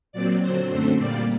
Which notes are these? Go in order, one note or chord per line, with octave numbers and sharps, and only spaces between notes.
A#2 F#3 C4 D5
D3 F#3 C4 C5
F#2 D3 A3 C4 C5
A#2 G3 A#3 D5